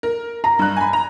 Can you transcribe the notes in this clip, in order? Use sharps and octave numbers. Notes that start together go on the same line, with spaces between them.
A#4
A#5
G2 F#6
G#5 B5
A#5